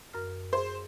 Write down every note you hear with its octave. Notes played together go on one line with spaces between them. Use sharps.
F#2 A#4 F6
G#4 C5